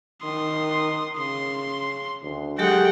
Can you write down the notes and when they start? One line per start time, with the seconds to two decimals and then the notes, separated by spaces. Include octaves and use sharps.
0.23 D#3 C6 D#6
1.18 C#3 C6
2.22 D2
2.58 F#3 G#3 G4 A4 F#5 G5